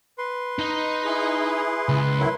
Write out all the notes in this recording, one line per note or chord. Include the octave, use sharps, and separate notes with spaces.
B4 C6
D#4 D#5
E4 G#4
C#2
D#3 F#3 E4